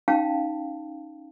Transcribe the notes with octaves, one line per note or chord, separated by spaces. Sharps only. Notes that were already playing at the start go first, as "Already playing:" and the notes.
C#4 D#4 F5 G5 A5